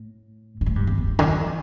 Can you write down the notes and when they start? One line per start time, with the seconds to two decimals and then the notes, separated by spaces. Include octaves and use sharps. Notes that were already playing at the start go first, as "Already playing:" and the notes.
Already playing: A2
0.61 G2
0.66 A2
0.76 G2
0.87 E2
0.98 E2
1.07 G2
1.19 D3
1.29 F3
1.40 E3